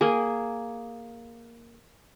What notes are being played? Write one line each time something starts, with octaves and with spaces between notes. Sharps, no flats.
A#3 G#4